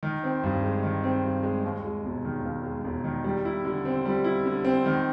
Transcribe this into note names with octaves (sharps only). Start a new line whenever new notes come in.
D#3
C4
G2
G#3
D#3
C4
G2
G#3
D#2
G#3
E1
D#3
D#2
G#3
E1
D#3
G3
E4
D3
C4
G3
E4
D3
C4
D#3